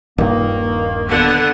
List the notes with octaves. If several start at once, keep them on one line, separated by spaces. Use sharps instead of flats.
D#1 G2 D#3 A#3
D3 B3 F#5